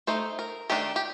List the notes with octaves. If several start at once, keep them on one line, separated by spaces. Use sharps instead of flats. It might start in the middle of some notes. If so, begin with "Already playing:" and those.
A3 D#4 C5
A#4
D#3 A3 D4 G4
G4